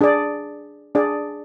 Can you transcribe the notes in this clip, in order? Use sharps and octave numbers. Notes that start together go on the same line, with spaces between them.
D4 G#4 D5
D4 G#4 D5